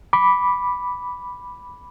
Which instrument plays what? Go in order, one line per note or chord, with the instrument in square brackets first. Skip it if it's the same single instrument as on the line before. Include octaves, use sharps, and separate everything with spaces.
[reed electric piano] B5 D6